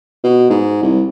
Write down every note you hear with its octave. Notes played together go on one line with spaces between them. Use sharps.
B2
G#2
C2